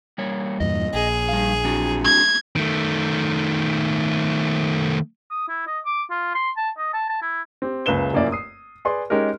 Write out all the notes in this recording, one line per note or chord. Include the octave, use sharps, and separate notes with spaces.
G3 A#3 C#5
E2 G2 A#2 D#5
A#1 G#4
G3 F5
C4 D4 F#4
G#6
D#3 A3
D#6
E4
D#5
D6
F4
C6
A5
D#5
A5
A5
E4
C4 G4
F#1 C#2 C#3 B4 E7 G7
F1 F#2 A#3 E4 D5
D#6 C7
G#4 B4 D5 C6
G#3 C#4 D#4 G4 A#4